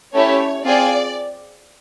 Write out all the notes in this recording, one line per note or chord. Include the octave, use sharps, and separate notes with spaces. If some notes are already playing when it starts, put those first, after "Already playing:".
A3 C#4 E4 G4 C#5
C4 F4 G#4 D5